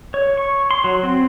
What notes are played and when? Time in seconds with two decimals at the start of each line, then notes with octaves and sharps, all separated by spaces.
0.14 C#5
0.37 C#6
0.71 C6
0.84 F#3
1.03 C4